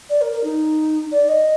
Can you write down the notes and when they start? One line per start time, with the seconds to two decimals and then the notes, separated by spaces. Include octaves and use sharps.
0.10 D5
0.21 A#4
0.33 A#4
0.44 D#4
1.12 D5
1.29 D#5